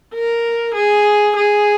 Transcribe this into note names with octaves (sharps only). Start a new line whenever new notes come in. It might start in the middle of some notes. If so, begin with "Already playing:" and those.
A#4
G#4
G#4